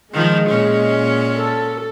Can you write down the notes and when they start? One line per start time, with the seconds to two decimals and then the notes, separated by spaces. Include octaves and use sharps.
0.13 D#3 F3 G#3
0.49 A#2 C#4
1.38 A4